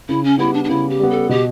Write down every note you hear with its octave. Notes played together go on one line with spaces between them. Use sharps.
C#3 E4
C#4
G3 B3 E4
D4
D4
C#3 E4
G4
G3 B3
A4
B2 G4